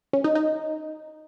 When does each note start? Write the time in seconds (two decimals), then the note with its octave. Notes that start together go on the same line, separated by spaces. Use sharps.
0.13 C#4
0.24 D#4
0.35 D#4